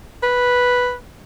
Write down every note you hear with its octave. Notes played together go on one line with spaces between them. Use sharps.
B4